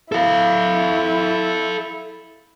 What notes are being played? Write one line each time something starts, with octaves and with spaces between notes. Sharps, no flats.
E4 A4 F5